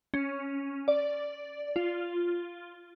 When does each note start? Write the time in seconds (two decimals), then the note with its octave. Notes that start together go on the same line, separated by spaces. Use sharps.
0.14 C#4
0.88 D5
1.76 F4